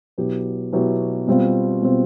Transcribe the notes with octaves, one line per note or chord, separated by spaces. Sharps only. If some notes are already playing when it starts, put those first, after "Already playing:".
B2 F#3 B3 E4 G4
B2 F#3 B3 E4 G4
B2 G3 C4 F4
B2 G3 C4 F4